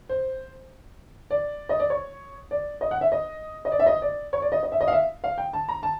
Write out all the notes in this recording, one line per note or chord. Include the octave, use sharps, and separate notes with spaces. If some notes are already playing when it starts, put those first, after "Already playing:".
C5
D5
D#5
D5
C#5
D5
D#5
F#5
E5
D#5
D#5
D5
E5
D#5
D5
C#5
D5
D#5
D#5
E5
D#5
F5
E5
F5
G5
A5
A#5
A5